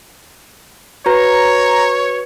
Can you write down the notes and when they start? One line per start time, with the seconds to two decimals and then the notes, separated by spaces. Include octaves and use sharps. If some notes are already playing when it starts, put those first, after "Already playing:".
1.06 F#4 B4 C#5 A#5